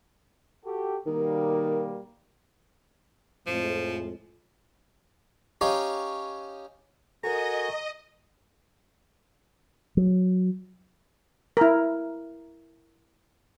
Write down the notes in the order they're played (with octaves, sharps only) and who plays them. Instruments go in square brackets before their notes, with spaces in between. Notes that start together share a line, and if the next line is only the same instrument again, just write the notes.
[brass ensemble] F#4 G4 A4
[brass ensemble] B2 G3 A#3 [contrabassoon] D#3
[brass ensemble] F2 A2 G#3 [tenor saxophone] F3
[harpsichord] C#4 D#4 G4 C#5 F5
[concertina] F#4 G#5 C#6 [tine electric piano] A4 A#4 [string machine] D#5 [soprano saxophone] A#5
[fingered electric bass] F#3
[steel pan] E4 A#4